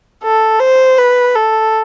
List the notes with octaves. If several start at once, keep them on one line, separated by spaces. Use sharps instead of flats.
A4
C5
B4
A4